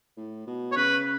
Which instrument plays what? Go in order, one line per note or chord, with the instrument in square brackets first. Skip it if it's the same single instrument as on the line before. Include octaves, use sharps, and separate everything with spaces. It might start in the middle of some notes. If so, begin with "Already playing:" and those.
[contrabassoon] A2
B2
[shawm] C#5
[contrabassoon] C#3 [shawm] B4